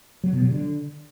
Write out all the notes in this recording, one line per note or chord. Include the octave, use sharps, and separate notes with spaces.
F#3
B2
F#3
D3